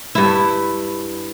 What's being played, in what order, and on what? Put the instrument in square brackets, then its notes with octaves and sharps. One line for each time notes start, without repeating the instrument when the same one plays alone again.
[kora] G2 E4